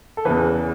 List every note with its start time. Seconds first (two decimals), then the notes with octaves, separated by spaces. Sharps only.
0.17 A4
0.25 E2 C#3 E3 B4